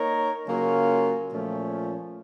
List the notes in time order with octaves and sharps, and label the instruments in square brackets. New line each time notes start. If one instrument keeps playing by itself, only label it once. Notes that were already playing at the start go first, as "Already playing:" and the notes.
Already playing: [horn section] A#3 D#4 A#4 C#5
C#3 F#3 A#3 C#4 F4
A#2 F3 A3 C#4